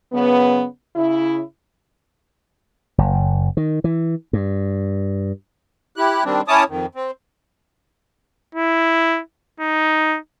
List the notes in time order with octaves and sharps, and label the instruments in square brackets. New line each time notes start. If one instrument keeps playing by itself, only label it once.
[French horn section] F#2 C#3 B3
C#3 E4
[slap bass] F#1
D#3
E3
G2
[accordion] E4 G4 F#6
D#3 G3 C4 D4
C#4 E4 C#5 A5 D6 D#6
F2 D#3
C4
[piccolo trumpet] E4
D#4